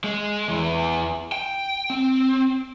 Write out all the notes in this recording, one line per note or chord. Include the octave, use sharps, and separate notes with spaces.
G#3
E2 E3
G5
C4